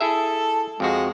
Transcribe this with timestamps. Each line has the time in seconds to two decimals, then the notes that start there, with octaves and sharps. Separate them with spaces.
0.01 E4 G#4 A4 E5
0.80 F2 F3 G#3 F#4